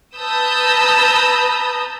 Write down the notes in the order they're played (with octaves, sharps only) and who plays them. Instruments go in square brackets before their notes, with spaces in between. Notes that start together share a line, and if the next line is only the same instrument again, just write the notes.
[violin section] B4 A5 A#5 D#6 E6 G6